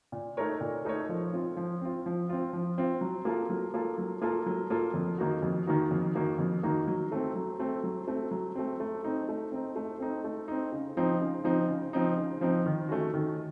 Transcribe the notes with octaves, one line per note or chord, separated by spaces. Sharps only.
A#2
A3 D#4 A#4 C#5
A#2
A3 D#4 A#4 C#5
F3
C4 F4
F3
C4 F4
F3
C4 F4
F3
C4 F4
F#3
A#3 F4 A4
F#3
A#3 F4 A4
F#3
A#3 F4 A4
F#3
A#3 F4 A4
F2
D#3 A#3 D#4 F#4
F2
D#3 A#3 D#4 F#4
F2
D#3 A#3 D#4 F#4
F2
D#3 A#3 D#4 F#4
F#3
A3 C4
F#3
A3 C4
F#3
A3 C4
F#3
A3 C4
A3
C4 D#4
A3
C4 D#4
A3
C4 D#4
A3
C4 D#4
C#3
F3 C4 D#4
C#3
F3 C4 D#4
C#3
F3 C4 D#4
C#3
F3 C4 D#4
D#3
A3 C#4 F#4
D#3